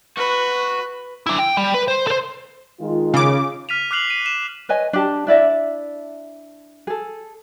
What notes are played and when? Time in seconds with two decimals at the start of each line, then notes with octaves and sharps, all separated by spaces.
0.17 F#4 B4
1.26 D4 E4
1.39 G5
1.57 G3
1.74 B4
1.88 C5
2.07 A4 C5
2.81 D#3 G#3 F4
3.14 C#3 D6
3.69 F6 B6 D#7 F7
3.91 D6 F6 F#6 C7 F7 F#7
4.10 D#7
4.26 E7
4.69 B4 C#5 D#5 G#5
4.93 D4 G4 A5
5.27 D4 E4 D5 E5
6.87 G#4 A4